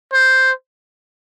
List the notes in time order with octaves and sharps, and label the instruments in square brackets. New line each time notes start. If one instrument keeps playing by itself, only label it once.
[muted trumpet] C5